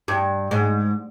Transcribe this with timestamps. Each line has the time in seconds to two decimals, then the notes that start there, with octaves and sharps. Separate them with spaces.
0.08 G2
0.51 G#2